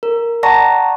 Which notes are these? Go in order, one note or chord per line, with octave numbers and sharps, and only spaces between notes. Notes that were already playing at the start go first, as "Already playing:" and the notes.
A#4
D5 F#5 A5 A#5 C#6 A#6